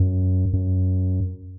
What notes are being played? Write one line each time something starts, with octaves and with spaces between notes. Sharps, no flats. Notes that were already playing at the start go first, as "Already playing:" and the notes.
Already playing: F#2
F#2